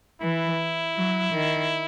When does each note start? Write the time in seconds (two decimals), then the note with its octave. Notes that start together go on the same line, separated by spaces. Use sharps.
0.21 E3 E4
0.96 F#3
1.33 D#3